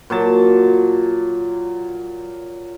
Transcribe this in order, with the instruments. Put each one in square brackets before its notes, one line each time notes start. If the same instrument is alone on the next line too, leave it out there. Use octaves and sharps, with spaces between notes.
[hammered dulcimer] A#2 F#3 A5